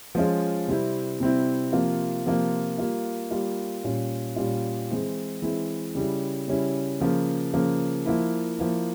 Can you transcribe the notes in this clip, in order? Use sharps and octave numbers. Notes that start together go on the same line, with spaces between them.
F3 G#3 C#4 F4
C3 G3 C4 E4
C3 G3 C4 E4
C3 F3 A#3 F4
C3 F3 A#3 F4
G3 A#3 F4
G3 A#3 F4
A#2 G3 C#4 F4
A#2 G3 C#4 F4
E3 G#3 C4 E4
E3 G#3 C4 E4
C#3 G3 C#4 E4
C#3 G3 C#4 E4
C#3 F3 A#3
C#3 F3 A#3
F3 A#3 E4
F3 A#3 E4